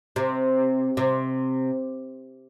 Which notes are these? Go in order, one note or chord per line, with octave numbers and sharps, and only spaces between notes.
C3
C3